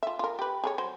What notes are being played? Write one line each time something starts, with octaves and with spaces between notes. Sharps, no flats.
F4 E5
F4 A#4
G4 B4
G#4 A#4 C#5
F#3 C5